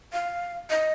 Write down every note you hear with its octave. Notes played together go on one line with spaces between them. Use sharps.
F5
D#5